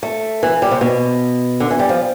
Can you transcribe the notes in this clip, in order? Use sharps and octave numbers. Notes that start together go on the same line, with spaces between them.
A3
E3
G3
C3
B2
D3
E3
G3
F3